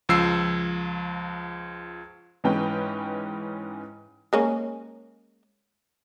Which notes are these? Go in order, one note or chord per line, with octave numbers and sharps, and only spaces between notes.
C#2 F3 E6 C7
G#2 E3 G#3 C#4 B4 G5
G#3 A#3 C#4